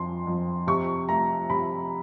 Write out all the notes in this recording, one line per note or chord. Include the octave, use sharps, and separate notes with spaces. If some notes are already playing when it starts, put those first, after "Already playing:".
Already playing: F2 C6
F2
C3 C#6
A3 A#5
C3 B5